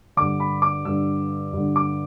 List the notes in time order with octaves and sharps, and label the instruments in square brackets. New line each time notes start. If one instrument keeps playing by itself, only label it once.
[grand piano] G2 D3 D6
B5
D6
G2 D3 E6
G2 D3
D6